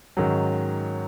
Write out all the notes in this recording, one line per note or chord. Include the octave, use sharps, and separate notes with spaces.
G#2 D#3 F#3 C#4